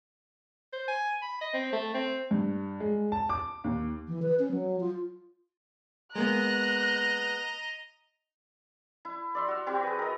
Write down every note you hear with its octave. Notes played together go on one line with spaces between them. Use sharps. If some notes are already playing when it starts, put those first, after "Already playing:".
C5
G#5
B5
D#5
C4
A3
C4
G2
G#3
A5
D6
D#2
E3
B4
C#4
F#3
F4
G#3 A#3 B3 D#5 A#5 F#6
E4
D5 E5 C6
F#4 F5
C4 E4 F#4 G4
G#4 B4
A#4 D#5